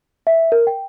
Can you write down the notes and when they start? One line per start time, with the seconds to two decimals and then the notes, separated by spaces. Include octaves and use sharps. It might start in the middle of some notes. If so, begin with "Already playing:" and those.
0.27 E5
0.52 A#4
0.67 G5